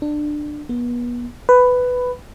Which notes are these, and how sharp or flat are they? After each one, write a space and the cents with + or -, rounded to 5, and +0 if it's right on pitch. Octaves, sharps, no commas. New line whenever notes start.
D4 +20
B3 -35
B4 +10